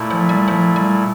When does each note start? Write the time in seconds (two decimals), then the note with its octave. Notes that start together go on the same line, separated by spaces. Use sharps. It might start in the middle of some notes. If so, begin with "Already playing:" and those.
Already playing: A#2 A3 E4
0.10 F3
0.29 G3
0.48 F3
0.76 G3